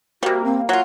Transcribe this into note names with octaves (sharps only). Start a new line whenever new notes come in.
C3 G3 A#3 F#4
C4
F#3 F4 F#5